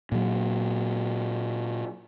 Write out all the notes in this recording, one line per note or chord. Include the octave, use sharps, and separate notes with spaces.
A#2 F#3